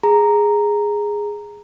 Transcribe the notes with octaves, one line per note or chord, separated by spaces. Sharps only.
G#4 A#5